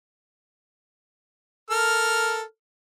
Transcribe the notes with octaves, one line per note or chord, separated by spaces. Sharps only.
A4 A#4 F6